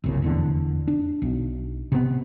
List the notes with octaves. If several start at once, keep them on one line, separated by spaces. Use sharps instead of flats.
F#1 C2 C#3
F1 E2 D3
D4
B1
C3 B3